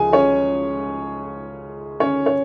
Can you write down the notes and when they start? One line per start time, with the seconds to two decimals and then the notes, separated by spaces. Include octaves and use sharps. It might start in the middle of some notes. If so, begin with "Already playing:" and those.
Already playing: C#2 C#3 F3 G#4 G#5
0.13 C#4 C#5
2.00 C#4 C#5
2.26 C#5